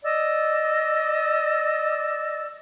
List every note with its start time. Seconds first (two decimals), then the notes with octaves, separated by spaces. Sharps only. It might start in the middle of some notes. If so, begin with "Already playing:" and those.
0.03 D5 D#5 E6